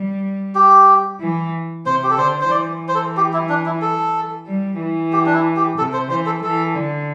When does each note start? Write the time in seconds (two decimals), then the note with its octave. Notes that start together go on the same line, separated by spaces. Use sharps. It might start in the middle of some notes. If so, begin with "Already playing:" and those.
Already playing: G3
0.55 G4
1.20 E3
1.86 C3 C5
2.04 G4
2.10 A4
2.18 D3 C5
2.41 C5
2.51 E3 D5
2.88 C5
2.95 A4
3.17 G4
3.33 E4
3.49 D4
3.66 E4
3.81 A4
4.47 G3
4.80 E3
5.12 G4
5.26 D4
5.34 E4
5.56 G4
5.78 C3 A4
5.93 C5
6.10 E3 C5
6.26 A4
6.43 E3 A4
6.75 D3